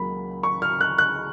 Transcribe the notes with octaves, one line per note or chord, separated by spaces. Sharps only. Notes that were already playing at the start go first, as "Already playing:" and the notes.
Already playing: C#2 C#3 F#3 A#3 B5
C#6
F6
F#6
F#6